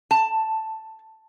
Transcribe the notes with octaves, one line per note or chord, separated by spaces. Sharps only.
A5